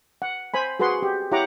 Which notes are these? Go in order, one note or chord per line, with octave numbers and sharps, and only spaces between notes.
F#5
C5 G#5 B5
F#4 G#4 B4 F#5 C6
G4
E4 G4 C#5 F#5 A#5 D6